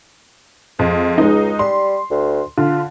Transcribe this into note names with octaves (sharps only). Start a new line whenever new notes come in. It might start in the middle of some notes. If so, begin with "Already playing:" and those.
F2 G#3
C#2 G#3 D#4
G3 C6
D2
D3 F4